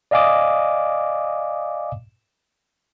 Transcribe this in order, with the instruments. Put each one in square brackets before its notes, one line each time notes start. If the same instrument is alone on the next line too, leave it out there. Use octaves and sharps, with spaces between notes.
[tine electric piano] D5 D#5 F5 G#5 D6 D#6